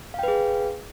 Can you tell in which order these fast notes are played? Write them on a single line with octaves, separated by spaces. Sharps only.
F5 G5 B4 G#4